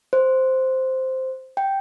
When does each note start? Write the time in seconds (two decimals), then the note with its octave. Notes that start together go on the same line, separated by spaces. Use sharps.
0.13 C5
1.57 G5